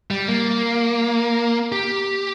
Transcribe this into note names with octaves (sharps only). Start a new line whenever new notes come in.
G3
A#3
G4